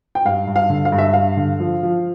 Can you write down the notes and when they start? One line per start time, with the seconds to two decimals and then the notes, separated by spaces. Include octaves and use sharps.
0.15 G5
0.25 G2 F5
0.47 G2
0.56 F5
0.70 D3
0.85 F5
0.92 G2
0.98 E5
1.13 G2 F5
1.37 D3
1.60 F3
1.83 F3